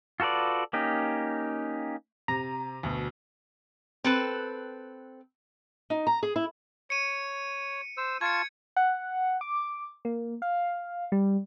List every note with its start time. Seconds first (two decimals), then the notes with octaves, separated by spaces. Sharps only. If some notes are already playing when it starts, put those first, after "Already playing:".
0.20 F4 F#4 A4 B4 D5
0.73 A#3 C#4 D#4 G4
2.28 C3 A#5
2.83 D2 B2
4.04 C4 A4 B4
5.90 D#4
6.07 A#5
6.23 G#4
6.36 E4
6.90 C#5 C#7 D#7
7.97 C5 E6
8.21 F4 A5 C#6 G#6 C#7
8.77 F#5
9.41 D6
10.05 A#3
10.42 F5
11.12 G3